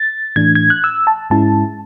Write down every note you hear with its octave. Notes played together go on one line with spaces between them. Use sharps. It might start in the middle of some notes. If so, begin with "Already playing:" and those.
Already playing: A6
A2 E3 A3 D4 G#6
G#6
F#6
E6
A5
G#2 G#3 C#4 E4 A5